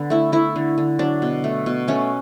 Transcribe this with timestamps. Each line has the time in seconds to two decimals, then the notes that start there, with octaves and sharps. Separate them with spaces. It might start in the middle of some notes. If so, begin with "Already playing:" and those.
Already playing: D3 B3
0.10 A3 E4
0.32 A3 E4
0.56 D3
0.78 D3
0.99 F#3 D4
1.22 B2
1.44 A3
1.66 B2
1.88 A3 C#4